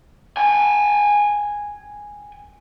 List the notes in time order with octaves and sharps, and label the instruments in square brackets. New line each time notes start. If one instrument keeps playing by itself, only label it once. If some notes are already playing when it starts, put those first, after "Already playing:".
[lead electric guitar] G5 G#5